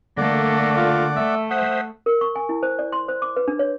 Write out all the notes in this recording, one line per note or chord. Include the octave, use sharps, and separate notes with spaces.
D3 A3 A#3 D5 F#5
F4
A3 E5
C5 E5 F#5 D#6
A#4
C#6
G#5
E4
C5
D5
C6
C5
D6
B4
D4
C#5